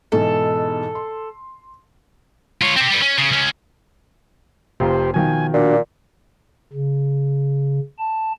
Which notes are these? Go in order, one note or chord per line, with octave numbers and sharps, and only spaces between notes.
G#2 B2 E3 A4
C6
F4 C#5
C4 G4
G3 B3
C#4
C#3
C#2 C#4
F1 F4 G4 C5 A#5
B2 D#3 F3 G#5
A#2 D4 F#4
C#3
A5